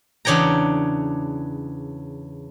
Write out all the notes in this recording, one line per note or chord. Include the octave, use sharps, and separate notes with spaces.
E2 C#3 D4 C#5 G5 A#5